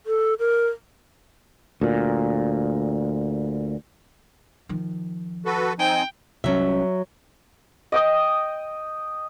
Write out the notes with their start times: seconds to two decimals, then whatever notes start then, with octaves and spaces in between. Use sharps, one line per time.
0.06 A4
0.39 A#4
1.81 D2 A#2
4.69 D#3 F3
5.45 F#4 A4 B4
5.79 C4 D#4 G5 G#5
6.44 C2 F#3 C#4 E5
7.92 D#5 G5 D#6